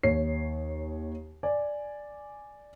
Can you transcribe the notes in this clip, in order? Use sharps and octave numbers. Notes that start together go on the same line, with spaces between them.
D#2 C#5 C7
D5 G#5